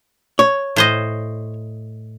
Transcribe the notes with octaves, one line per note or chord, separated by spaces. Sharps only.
C#5
A2 C5 D#5